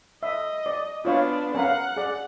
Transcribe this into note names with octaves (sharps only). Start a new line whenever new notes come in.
D#5 E5
D5
B3 D4 F4 C#5 F5
C#4 A#4 F5 F#5
G#4 D5